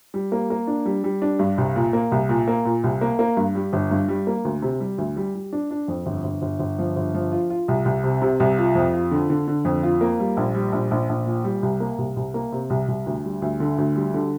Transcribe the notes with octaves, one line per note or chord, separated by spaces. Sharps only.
G3
A#3
A#3
D4
G3
G3
D4
G2
C2
A#2
A#3
C2
A#2
A#3
A#2
C2
A#3
A#3
G2
G3
G1
G2
G3
A#3
D2
C3
G3
D2
G3
G3
D4
D4
F2
G1
G1
G1
G1
F3
G1
F3
F4
F4
C2
C2
C3
C3
C2
F4
F2
F4
D3
D3
D3
F2
F4
A#3
G3
A#1
G3
A#1
A#1
A#1
A#2
G3
C2
A#3
C2
C2
A#3
C3
C2
C2
D2
G3
D2
D3
D2
G3
D3